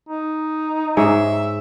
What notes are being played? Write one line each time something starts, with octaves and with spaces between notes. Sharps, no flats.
D#4
G#2 G#3 C#5 E5